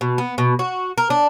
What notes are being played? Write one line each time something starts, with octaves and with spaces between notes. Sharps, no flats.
B2
B3
B2
F#4
A#4
D4